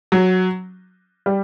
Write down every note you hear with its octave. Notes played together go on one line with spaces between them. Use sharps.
F#3
G3